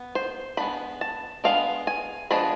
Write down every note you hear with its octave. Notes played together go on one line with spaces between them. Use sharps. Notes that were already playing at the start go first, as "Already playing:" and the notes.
Already playing: B3
C5
G#3 B3 D4 B5
A5
G#3 B3 D4 F5
G#5
F3 G#3 B3 D4 B5